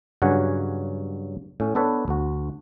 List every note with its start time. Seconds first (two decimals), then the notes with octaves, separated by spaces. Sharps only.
0.22 G2 C#3 F#3 C#5 F#5 G#5
1.60 A2 C#4
1.75 B3 D4 A4 B4 C#5
2.08 D2 F#4